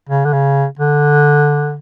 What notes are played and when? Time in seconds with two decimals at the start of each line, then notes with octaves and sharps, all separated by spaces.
0.09 C#3
0.25 D3
0.33 C#3
0.79 D3